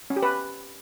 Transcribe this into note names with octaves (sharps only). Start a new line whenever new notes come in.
C#4
G4
B4